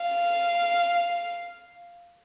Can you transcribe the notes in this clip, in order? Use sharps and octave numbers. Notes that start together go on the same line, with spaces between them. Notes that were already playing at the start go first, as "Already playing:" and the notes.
Already playing: F5